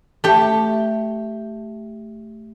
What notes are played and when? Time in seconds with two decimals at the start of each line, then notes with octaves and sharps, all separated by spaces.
0.24 A3 G4